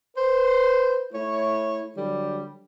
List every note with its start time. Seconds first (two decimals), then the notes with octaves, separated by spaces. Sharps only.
0.17 B4 C5
1.13 A3 E4 C#5
1.97 D3 F#3 G3